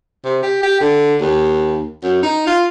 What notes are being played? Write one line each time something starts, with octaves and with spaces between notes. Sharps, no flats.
C3
G4
G4
D3
D#2
F#2
D#4
F4